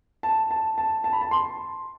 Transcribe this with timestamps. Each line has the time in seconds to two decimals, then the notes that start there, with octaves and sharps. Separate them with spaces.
0.23 A5
0.51 A5
0.78 A5
1.04 A5
1.13 B5
1.21 A5
1.31 C6